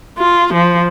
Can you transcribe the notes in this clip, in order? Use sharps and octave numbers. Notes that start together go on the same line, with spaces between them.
F4
F3